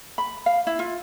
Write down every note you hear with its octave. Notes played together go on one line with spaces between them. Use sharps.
B5
F5
E4
F4